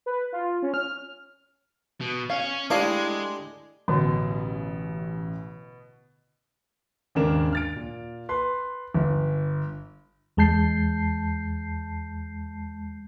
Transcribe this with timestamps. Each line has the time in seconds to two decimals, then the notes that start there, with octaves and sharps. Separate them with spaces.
0.06 B4
0.33 F4
0.62 C#4
0.74 F6
2.01 B2
2.30 C#4 F5
2.70 G#3 A3 D4 E4 G4 D#5 F5
3.88 A1 B2 D3
7.15 D#2 G#2 C#3 D4 A#4 E7
7.53 F6 A6 D7
7.76 A#2
8.29 B4 C6
8.94 G1
10.37 E2 G#3 A5 G6 C7